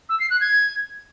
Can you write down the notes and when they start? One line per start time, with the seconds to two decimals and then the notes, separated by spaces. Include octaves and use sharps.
0.09 E6
0.20 C7
0.30 F#6
0.41 G#6